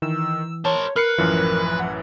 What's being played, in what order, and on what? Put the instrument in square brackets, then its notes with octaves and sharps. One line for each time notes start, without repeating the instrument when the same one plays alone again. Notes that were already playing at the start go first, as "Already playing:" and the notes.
[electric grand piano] D#3 [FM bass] E3 [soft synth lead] E6
[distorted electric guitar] A#4 C5 [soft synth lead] C#5 [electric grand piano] A5
[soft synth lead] A#4 [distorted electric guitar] B4 [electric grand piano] F6 C7 C#7
[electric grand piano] A1 F#2 E3 [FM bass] F3
[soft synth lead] F#5